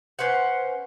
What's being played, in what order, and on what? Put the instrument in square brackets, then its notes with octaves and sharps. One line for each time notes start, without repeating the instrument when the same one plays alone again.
[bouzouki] C#4 B4 C5 F#5